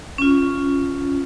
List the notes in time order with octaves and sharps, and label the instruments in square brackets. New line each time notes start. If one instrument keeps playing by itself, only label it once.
[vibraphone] C#4 F4